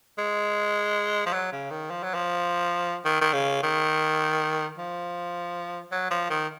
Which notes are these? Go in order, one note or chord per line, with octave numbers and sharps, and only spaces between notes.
G#3
F3
F#3
C#3
D#3
F3
F#3
F3
D#3
D#3
C#3
D#3
F3
F#3
F3
D#3